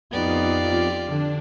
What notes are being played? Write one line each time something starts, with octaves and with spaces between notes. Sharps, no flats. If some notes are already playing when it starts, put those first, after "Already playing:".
F2 B3 D#4 F4 G4 D5
D3 D4